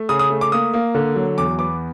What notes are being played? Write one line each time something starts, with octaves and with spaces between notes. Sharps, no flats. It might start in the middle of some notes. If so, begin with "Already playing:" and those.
Already playing: A3
C#3 D#6
D#6
A3
D6
A#3 D#6
A#3
D3
F#3
E2 D6
B3 D6